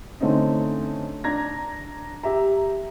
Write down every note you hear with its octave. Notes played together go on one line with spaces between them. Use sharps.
D3 A3 C4 C#4 D#4
D4 A#5 G#6 A#6
G4 E5 A#5